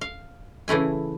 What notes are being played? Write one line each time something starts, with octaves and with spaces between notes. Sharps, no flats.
F5
C#3 E3 A3 E4 G#5